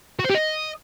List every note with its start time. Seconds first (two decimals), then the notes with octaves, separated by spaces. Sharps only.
0.19 F#4
0.25 C5
0.30 G4
0.35 D#5